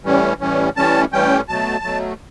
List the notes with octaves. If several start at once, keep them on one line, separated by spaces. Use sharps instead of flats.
A2 E3 G3 C#4
A2 E3 G3 C#4
A2 E3 G3 C#4 A5
A2 E3 G3 C#4 G5
B2 F#3 A3 A5
B2 F#3 A3